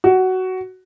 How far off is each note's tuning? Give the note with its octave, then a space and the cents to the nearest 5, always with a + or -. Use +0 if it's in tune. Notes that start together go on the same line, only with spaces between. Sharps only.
F#4 +10